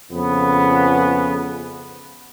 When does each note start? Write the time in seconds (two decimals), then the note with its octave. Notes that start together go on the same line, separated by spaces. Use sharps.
0.12 F2 C#3 B3